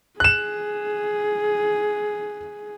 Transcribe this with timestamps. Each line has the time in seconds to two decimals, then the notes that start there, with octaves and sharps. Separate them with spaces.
0.20 G#4 F#6 E7